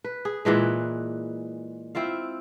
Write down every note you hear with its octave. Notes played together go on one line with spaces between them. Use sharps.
B4
G#4
A#2 E3 G#3 B4
C4 E4 F4 F5